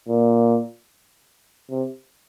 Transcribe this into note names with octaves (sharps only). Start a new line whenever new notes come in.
A#2
C3